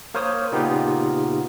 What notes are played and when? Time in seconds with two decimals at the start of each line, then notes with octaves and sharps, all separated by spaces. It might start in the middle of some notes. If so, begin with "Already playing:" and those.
0.14 A#3 A#4 C5 C#5 D#6
0.52 A#2 C#3 B3 D#4 F4 G4